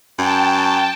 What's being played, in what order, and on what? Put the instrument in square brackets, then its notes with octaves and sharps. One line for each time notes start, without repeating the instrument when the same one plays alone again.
[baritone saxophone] F#2 [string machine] G5 A5